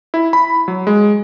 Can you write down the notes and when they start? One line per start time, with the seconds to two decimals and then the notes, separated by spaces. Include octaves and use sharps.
0.14 E4
0.33 B5
0.68 F#3
0.87 G#3